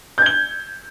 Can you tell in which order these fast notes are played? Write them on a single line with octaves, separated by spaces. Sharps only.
G6 G#6 G7